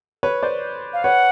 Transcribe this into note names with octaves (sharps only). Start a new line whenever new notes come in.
B4 C#5
C5 D5
F5
B4 C#5 F#5